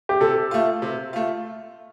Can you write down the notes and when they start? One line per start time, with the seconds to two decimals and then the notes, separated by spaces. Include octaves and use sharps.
0.09 G4
0.21 C3 A4
0.51 A3 F4
0.82 C3
1.13 A3 F4